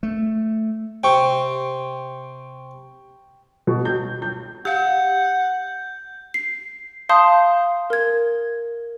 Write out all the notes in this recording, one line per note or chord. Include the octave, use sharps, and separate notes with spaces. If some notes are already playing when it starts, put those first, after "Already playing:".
A3
C3 G5 C#6
B2
G6
G6
G4 F5 F#5 G6
C7
F5 A5 C6 D#6 G6
A#4 G#6